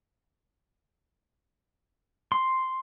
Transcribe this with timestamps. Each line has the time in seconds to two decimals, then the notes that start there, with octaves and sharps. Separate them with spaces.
2.32 C6